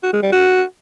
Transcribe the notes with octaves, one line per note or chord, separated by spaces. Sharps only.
F#4
G#3
G3
F#4